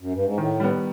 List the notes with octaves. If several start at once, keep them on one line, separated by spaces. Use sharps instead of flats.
F#2
G2
G#2
A2 D#3
G3 B3